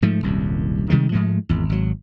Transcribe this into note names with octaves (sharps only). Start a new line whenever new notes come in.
G#2 F3 A3
D#1 C2 F#2
C3 D#3 G3 G#3
G#2 F3 G#3 A3
G#1 E2
G#1 F#3